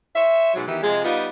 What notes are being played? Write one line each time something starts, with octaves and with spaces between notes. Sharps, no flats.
C5 C#5 E5
G#2 B2 F#3
D#3 E3 B3 D#4 G4
C3 F3 G#3
G3 B3 D#4 F4